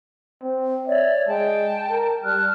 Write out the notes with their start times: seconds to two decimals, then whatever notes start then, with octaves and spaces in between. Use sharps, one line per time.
0.42 C4
0.88 C#5 D5 E5
1.28 G#3 G5 A5
1.90 A#4
2.24 G3 A5 F6 F#6